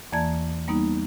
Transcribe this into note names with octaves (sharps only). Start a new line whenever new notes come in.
E2 E3 A#3 D5 A5 G#6
G3 A#3 B3 D#4